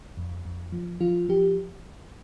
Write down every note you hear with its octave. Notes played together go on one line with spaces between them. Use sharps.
F2
F2
F3
F3 F4
F3 G4